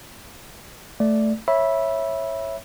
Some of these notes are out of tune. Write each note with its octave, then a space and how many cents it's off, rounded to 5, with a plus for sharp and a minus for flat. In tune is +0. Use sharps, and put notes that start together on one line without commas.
A3 +0 D5 +0
C#5 -15 E5 +0 B5 -20